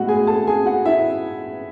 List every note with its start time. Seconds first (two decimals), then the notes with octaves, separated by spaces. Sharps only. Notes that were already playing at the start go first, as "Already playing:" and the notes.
Already playing: A2 G#3 B3 F#4 F#5
0.08 G#4 G#5
0.27 A4 A5
0.47 G#4 G#5
0.66 F#4 F#5
0.86 E4 E5